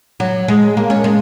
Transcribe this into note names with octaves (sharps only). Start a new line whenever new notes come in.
F#3
G#3
A#3
C#4
G#3